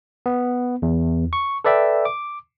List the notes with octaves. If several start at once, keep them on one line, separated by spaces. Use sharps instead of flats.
B3
E2
C#6
A4 B4 D5 E5 G5
D6